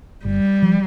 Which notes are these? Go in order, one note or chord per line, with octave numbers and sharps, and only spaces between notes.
G1 G3
F3